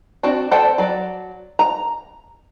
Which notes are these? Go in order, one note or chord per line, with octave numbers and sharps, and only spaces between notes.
C4 D4 F#4 D5
A4 C5 D5 G5 A5
F#3 D5
A#5